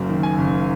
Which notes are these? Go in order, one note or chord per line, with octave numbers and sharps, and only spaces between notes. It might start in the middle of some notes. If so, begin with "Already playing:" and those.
Already playing: F#1 F#2 A#3
D#3
G#5
F#1